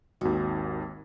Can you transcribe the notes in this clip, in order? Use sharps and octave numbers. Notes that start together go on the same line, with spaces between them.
G#1 D#2 F#4